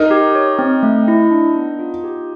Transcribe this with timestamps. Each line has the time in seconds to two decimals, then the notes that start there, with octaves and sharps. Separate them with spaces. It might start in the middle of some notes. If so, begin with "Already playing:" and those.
Already playing: D#4 A#4
0.11 G4
0.35 C#5
0.59 C4
0.83 A3
1.08 E4
1.31 D4
1.55 B3
1.79 F4
2.04 G4